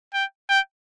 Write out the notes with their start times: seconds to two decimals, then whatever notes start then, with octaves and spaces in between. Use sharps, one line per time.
0.14 G5
0.49 G5